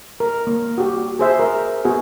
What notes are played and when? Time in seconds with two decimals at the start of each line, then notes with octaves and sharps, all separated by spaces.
0.20 A#4
0.47 A#3
0.78 F#4 G4
1.19 G#4 C5 E5
1.39 A#4
1.85 B3 F#4 G#4